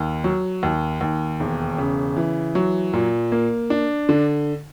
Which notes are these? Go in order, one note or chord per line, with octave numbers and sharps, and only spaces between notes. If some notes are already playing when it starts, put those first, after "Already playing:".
Already playing: D#2
F#3
D#2
D#2
E1
C#3
E3
F#3
A#2
A#3
D4
D3